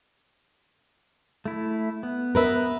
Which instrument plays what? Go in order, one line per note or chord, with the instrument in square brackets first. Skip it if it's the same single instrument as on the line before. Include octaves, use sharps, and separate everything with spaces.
[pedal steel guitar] A3 E4
B3
[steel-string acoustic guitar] A#4 B4 E5